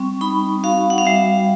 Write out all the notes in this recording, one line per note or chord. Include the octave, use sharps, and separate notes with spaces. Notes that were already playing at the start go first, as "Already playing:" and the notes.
Already playing: G3 C4 C#6
D#4 B5
F#4 F5
F#5
F5
G3 E5